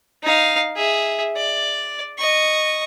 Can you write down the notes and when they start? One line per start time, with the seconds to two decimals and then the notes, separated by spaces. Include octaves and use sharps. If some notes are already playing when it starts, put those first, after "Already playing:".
0.23 D#4 F5
0.76 G#4 E5
1.36 D5
2.18 D#5 C#6